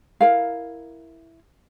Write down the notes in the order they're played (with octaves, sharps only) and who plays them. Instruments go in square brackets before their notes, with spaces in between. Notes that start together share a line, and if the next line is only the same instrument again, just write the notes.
[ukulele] E4 A#4 F5